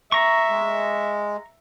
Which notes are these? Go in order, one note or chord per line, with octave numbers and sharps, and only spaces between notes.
E5 A#5 C#6
G#3